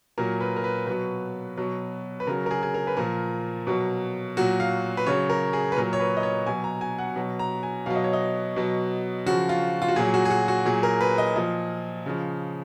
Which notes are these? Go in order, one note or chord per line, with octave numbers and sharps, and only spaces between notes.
A#2 F#3 A#4
B4
A#4
B4
B2 F#3 B4
B2 F#3
B4
C#3 F#3 A#4
A#4
G#4
G#4
A#4
B4
A#2 F3 A#4
B2 F#3
A#2 F#3 F#4
F5
B4
C#3 F#3 C#5
A#4
G#4
B4
A#2 F#3 A#4
C#5
B4
D#5
C#5
B2 F#3 G#5
A#5
G#5
F#5
B2 F#3
A#5
G#5
B2 F#3 F5
D#5
C#5
D#5
B2 F#3
C#3 F3 F#4
F4
F4
F#4
A#2 F#3 G#4
F#4
G#4
F#4
F#4
A#2 F#3 G#4
A#4
B4
D#5
A#2 F3 D#5
C#3 F3